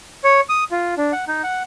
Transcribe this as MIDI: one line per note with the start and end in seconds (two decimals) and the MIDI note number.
0.24 0.41 73
0.49 0.64 87
0.71 0.94 65
0.98 1.12 62
1.13 1.25 78
1.28 1.42 63
1.44 1.63 78